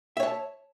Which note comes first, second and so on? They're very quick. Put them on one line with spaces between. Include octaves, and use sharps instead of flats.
E5 C#5 A5